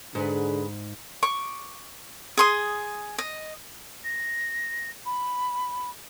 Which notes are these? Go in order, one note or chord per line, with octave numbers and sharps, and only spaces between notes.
G#2 D3 G#4 B4
C#6 D6
G#4 C6 D#6
D#5
A#6
B5